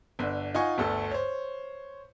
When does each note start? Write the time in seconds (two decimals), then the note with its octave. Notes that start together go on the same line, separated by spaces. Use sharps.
0.19 G1 D3
0.54 D#4 F4 D#5 F#5 G#5 C#6
0.78 G1 D2 A3 A4
1.11 C5 C#5